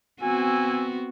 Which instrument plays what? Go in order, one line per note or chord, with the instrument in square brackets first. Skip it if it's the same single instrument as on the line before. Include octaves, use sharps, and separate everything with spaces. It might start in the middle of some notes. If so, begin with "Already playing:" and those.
[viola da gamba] B3 C4 F#4 [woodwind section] G#5 E6